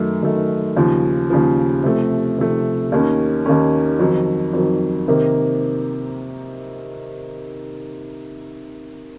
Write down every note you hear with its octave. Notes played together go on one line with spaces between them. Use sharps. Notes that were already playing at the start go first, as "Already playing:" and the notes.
Already playing: F#2 D#3 A3
F#2 D#3 A3
D#2 C#3 F3
D#2 C#3 F3
C3 F3 A3
C3 F3 A3
D#2 D#3 A#3 C#4
D#2 D#3 A#3 C#4
F2 D#3 F#3
F2 D#3 F#3
C3 D#3 A#3